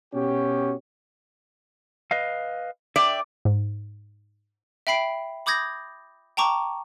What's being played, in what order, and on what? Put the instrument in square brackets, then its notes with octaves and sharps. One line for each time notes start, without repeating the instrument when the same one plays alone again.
[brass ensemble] B2 C#4 F#4 G4
[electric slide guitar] B4 D#5 F5
[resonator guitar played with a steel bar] D5 [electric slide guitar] E5 G5
[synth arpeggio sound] G#2
[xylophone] E5 G5 B5 C7 D7
B5 D6 D#6 G6 G#6 A#6
G5 A5 A#5 C#6 D6